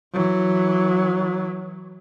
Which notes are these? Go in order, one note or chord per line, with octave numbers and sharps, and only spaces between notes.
E3 F#3